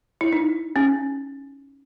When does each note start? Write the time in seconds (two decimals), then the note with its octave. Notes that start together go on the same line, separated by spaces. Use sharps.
0.21 E4
0.32 D#4
0.76 C#4